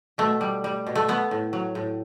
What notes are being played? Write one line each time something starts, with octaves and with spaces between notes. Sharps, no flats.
B2 A3
G3
G3
B2
A3
A3 B3
A2
F#3
A2